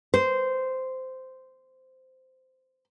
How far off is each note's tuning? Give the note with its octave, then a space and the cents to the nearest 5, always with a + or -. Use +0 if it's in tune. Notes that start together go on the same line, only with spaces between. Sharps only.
C5 -10